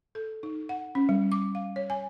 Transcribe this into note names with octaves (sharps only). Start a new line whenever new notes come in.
A4
D#4
F#5
C#4
G3
D6
F5
C#5
G#5